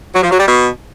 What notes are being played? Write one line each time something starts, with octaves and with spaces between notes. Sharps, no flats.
F#3
F3
F#3
G3
B2